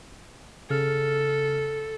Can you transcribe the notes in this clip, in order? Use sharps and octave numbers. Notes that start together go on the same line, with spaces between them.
C#3 A4 F6